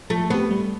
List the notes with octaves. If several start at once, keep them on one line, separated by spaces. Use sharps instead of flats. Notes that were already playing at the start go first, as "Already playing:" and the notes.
F3 A3
B3 C4 G4
G3